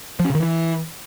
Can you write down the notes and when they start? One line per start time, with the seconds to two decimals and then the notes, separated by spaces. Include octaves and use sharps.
0.20 F3
0.25 C#4
0.30 C3
0.35 D#3
0.40 E3